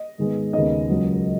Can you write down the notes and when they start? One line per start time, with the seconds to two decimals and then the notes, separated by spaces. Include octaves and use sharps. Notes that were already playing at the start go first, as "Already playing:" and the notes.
Already playing: D#5
0.18 G#2 D#3 G#3 B3
0.53 D#2 C#3 G#3 B3 D#4 D#5
0.89 C#2 C#3 F#3